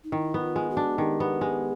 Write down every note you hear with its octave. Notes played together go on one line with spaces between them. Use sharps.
D#4
D#3 E4
B3
F4
G#3
F#4
D4
D#3 G4
B3
G#3